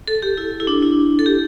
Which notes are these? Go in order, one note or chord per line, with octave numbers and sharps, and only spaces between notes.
A4
G4
E4
E4
D4
E4
A4
G4